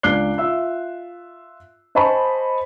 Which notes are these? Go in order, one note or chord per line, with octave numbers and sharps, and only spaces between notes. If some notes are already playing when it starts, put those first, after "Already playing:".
C#2 D4 D6 F#6 C7 G7
F4 E5 E6
C5 D#5 G#5 A5 B5 C#6